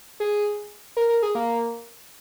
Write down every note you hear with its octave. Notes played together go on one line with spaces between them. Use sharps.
G#4
A#4
A#4
G#4
A#3